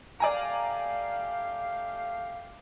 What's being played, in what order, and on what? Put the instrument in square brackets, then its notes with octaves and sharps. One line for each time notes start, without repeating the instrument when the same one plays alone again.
[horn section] A3 G4 F5 [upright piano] D5 G#5 A#5